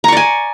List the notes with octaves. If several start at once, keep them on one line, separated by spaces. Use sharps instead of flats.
D5 G#5 A#5 C#6